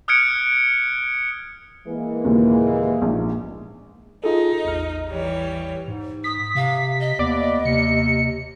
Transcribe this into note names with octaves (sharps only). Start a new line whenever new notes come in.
D#6 F6 F#6 G#6 C#7 D7
E3 G#3 A#3
D#2 A#2 C#3
A#1 G#2
D#4 F4 G#4 A4
A1 E2 F6
E3 G3 C#5
G#2
D#6 B6
C3 F5
D#5
D#2 B3 D5
D#2 C3 C#7